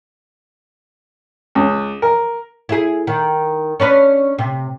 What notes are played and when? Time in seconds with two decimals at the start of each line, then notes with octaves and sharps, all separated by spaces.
1.55 C#2
2.02 A#4
2.69 E4 G#4
3.07 D#3
3.80 C#4 D4 B4
4.38 C3